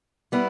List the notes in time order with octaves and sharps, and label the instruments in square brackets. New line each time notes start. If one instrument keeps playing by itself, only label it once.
[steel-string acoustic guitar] G3 B3 E4